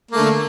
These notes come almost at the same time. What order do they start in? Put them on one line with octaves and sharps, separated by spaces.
A#3 A3 D3